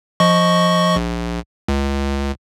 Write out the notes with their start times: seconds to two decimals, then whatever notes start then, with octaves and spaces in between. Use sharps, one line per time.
0.20 F3 D#5 C#6
0.96 A#1
1.68 C#2